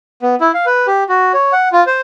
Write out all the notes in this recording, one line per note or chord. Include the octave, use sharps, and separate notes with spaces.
B3
E4
F5
B4
G4
F#4
C#5
F#5
F4
C5